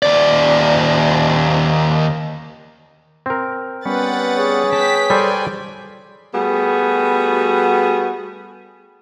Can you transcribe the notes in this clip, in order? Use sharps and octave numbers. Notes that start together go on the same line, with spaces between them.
D#2 D5
C4 A#4
G3 B3 C#4 B4 F#5 A6
G#4 C#5
B4 G5 A5 B6
G3 G4 A4 B4 C5 D5 G#5
G3 A3 B3 F#4 G#4